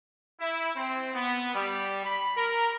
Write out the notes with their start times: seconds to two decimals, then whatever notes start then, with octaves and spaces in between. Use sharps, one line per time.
0.40 E4
0.76 C4
1.14 B3
1.54 G3
2.04 B5
2.37 A#4